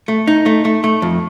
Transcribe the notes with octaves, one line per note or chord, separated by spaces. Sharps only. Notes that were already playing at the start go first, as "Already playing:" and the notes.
A3
D#4
A3
A3
A3
F2